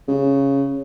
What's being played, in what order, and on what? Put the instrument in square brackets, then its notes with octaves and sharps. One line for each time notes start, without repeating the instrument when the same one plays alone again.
[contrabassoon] C#3